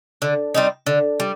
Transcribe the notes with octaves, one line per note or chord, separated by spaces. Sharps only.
D3
G3 C4 D#4
D3
G3